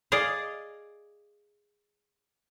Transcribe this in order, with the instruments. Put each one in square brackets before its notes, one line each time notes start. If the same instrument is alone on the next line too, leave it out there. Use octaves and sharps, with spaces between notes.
[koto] G#4 D5 D#5 F5